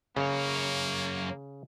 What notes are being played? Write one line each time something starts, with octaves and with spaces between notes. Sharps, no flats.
F#2 C#3 A#3 C#5